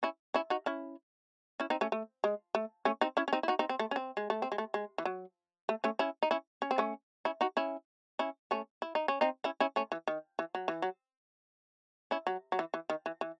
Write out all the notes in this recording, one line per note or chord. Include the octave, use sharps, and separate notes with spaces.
C#4 E4
C#4 E4
D#4 F#4
C#4 E4
C#4 E4
C4 D#4
A3 C#4
A3
G#3
A3
A3 C#4
C4 D#4
C#4 E4
C#4
C4 D#4
E4
D#4 F#4
C4 D#4
C4
A3
C#4
C4
G#3
A3
C4
G#3
A3
G#3
E3
F#3
A3
A3 C#4
C#4 E4
D#4
C#4 E4
C#4
C4
A3 C#4
C#4 E4
D#4 F#4
C#4 E4
C#4 E4
A3 C#4
E4
D#4
C#4
C4 D#4
C#4 E4
C#4 E4
A3 C#4
E3
D#3
E3
F#3
E3
F#3
C#4 E4
F#3
F#3
E3
E3
D#3
E3
E3